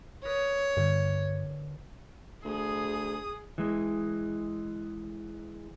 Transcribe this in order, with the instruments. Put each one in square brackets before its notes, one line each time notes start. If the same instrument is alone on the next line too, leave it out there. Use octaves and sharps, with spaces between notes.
[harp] A#4 B4 D#6 [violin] C#5
[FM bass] G2 [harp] D3
[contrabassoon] D2 [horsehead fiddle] G#4 [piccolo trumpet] D#6
[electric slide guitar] E3 G#3